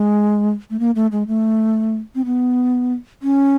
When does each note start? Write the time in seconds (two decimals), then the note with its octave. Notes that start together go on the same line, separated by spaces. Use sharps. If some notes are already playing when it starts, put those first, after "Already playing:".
Already playing: G#3
0.70 A3
0.79 A#3
0.95 A3
1.12 G#3
1.28 A3
2.15 C4
2.25 B3
3.22 C#4